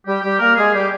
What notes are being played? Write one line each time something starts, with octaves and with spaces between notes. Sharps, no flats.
G3 G4
G3 G4
A#3 A#4
G#3 G#4
G3 G4